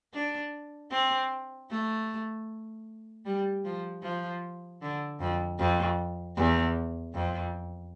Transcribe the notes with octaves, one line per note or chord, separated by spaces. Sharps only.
D4
C4
A3
G3
F3
F3
D3
F2
F2
E2
F2